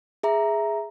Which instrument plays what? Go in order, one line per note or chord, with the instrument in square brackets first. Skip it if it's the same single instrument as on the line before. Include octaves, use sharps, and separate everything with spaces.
[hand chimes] G#4 E5 A#5